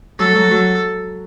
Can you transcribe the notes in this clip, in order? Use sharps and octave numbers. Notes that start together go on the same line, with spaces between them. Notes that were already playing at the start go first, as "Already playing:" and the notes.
F#3 A4
F#3
F#3